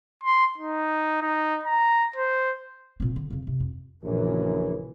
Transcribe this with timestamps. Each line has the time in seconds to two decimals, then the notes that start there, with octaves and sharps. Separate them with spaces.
0.24 C6
0.58 D#4
1.22 D#4
1.65 A#5
2.16 C5
3.00 A#2 C4
3.16 D3
3.30 F2 C#3
3.47 C3
3.60 F2
4.03 A#1 F#2 A#2 C#3 E3